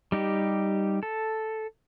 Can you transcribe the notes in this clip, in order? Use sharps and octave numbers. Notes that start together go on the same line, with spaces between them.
G3 D#4 G4
A4